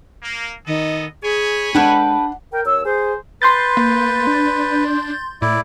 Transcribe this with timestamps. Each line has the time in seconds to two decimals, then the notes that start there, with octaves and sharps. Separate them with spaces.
0.22 A#3
0.67 D#3 B3 A4 D#5
1.23 G#4 C#5 G#5 B5
1.75 G#3 D4 A4 B4 F#5 G5
2.53 A#4 G5
2.66 D#2 C#5 E6
2.85 G#4 C5
3.42 B4 C6 G6 A6
3.77 A#3
4.27 D4
5.42 A2 E4 D5